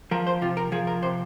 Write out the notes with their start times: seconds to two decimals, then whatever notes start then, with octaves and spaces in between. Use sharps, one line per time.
0.11 F3 A#4
0.27 C5
0.42 C3 F4
0.57 A#4
0.72 F3 G#4
0.87 A#4
1.02 C3 C5